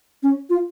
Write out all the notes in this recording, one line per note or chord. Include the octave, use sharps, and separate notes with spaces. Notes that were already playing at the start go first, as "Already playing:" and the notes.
C#4
F4